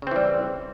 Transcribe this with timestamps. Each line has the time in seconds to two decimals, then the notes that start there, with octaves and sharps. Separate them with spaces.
0.02 C#3
0.07 C4
0.11 E3
0.16 G3